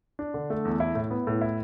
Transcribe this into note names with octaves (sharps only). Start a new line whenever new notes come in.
D4
D3
A3
E2
E4
A2
B3
A2
E4